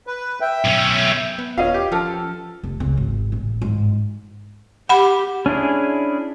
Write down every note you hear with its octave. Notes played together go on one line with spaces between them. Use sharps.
B4
E5 G5
B1 C#4
B3
D#1 C#4 F4 B4 D#5 F5 F#5
G4
F3 C#4 A4 A5 F6
F1
C#2
G#1
A1
G#2
G4 F#5 B5
C#4 D4 E4 G#4